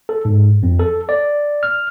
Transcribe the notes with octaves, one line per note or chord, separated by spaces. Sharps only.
A4
G#2
F2
A4
D5
F6